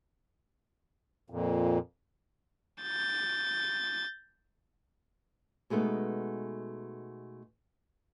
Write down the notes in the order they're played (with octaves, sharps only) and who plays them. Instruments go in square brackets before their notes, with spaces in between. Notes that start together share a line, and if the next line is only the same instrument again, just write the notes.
[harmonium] F2 A#2
[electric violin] G6 A6
[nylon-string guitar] B2 G#3 A3 B3 D#4